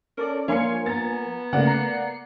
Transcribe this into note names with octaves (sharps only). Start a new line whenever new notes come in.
C#4 A4 A#4 D5
F3 A#3 D4 C#5 F5 G#5 C6 C#7
B3 A#5 A6
C#3 A3 A#3 D5 F#5
A#5 C7 C#7